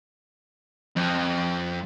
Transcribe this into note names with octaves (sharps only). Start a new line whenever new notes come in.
F2